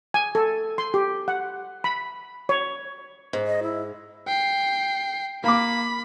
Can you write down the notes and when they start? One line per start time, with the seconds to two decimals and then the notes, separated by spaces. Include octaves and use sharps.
0.14 G#5
0.35 A4
0.78 C6
0.94 G4
1.28 F#5
1.84 B5
2.49 C#5
3.33 G#2
3.47 D#5
3.63 E4
4.27 G5 C7
5.44 A#3 B5 D6